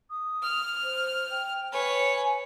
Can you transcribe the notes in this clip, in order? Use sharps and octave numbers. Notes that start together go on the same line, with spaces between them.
D#6
F6
C5
G5
B4 C#5 G#5